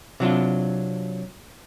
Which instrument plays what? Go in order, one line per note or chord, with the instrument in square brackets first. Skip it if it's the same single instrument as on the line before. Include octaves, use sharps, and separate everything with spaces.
[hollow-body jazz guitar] C3 F#3 D4 F4